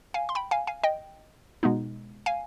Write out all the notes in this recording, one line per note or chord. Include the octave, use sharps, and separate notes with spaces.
F5 G#5
C6
G5 B5
F5 G#5
F5 G#5
D#5 G5
B2 G#3 B3 D#4
F5 G#5